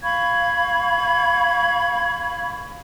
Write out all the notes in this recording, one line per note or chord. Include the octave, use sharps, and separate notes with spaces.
F5 B5 C#6 G#6